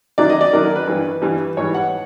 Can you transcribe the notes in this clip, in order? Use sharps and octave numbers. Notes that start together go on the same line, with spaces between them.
F#2 D#3 F#3 D5
D#5
D5
F#2 D#3 F#3 A#4
A#4
B4
G2 E3 G3
G2 E3 G3
G#2 E3 G3 C#5
F#5